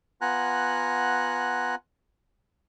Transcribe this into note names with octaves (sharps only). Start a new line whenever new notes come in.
B3 F4 F#5 G#5 A#5 F#6